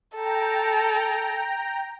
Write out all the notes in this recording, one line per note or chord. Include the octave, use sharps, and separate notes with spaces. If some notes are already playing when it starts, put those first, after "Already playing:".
A4 G5 A#5